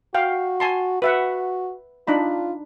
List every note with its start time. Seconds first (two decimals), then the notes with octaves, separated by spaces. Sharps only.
0.15 F#4 F5 G5
0.60 G#5 A5 C6
1.02 F#4 B4 E5 F#5
2.08 D4 D#4 F4 B5